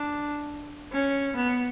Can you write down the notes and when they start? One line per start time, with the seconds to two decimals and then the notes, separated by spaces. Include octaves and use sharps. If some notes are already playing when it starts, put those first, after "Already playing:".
Already playing: D4
0.92 C#4
1.35 B3